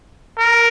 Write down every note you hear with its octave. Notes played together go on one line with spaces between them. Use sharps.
A#4